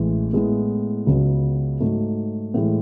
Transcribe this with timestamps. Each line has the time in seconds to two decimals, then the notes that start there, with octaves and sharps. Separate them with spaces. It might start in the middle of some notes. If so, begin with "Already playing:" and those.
Already playing: A1 A2 E3 G#3
0.33 A2 G#3 B3 E4
1.07 C#2 C#3 F#3 B3
1.80 G#2 F#3 A3
2.54 A2 E3 G#3